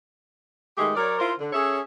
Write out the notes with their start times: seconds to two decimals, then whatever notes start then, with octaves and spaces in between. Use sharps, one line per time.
0.78 D#3 G#3 A3 G4 G#4
0.95 F#3 A#4 C#5 D5
1.19 E4 F4 A#4 C5
1.40 D3
1.53 C#4 G#4 A4 C#5 E5